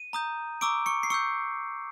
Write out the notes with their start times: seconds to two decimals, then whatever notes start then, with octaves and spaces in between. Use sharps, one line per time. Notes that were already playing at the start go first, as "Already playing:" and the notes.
Already playing: D#7
0.13 A#5 D#6 G6
0.61 A#5 C#6 D6 E6 D7
0.86 C#6 C#7
1.03 C7
1.10 C#6 E6 G6 C#7